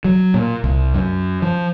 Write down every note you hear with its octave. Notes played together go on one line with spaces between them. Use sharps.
F#3
A#2
C2
F#2
F3